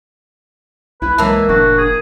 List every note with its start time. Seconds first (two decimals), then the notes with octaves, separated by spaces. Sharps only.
1.02 C2 E4 B4
1.18 E3 G#3 A#3 C#5 E5 A5
1.49 F1 A2 D4 F#4
1.78 G#4